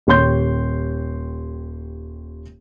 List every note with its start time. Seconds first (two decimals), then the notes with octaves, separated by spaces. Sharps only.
0.07 D#1 G4 C#5 C6 G6